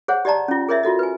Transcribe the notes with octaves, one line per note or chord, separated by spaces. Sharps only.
G#4 C5 C#5 F#5
G4 D5 D#5 A5 A#5
C#4 F4
G#4 A#4 C#5 D#5 E5
F4 F#4 A4 D#5
B4 G#5